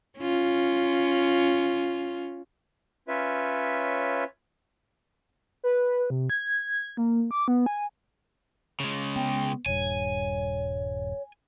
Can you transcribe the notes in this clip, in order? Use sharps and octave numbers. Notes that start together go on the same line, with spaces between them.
C#4 F4
C#4 F4 B4 C#5 E5
B4
C3
G#6
A#3
D6
B3
G#5
C#3 G#3
B3 G5
D#1 G2 C#5 G#5